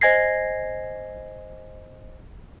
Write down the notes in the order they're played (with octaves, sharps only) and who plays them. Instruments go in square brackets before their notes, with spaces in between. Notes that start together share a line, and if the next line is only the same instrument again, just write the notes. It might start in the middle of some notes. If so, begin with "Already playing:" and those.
[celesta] C5 D#5 G#5 G#6 A#6 C7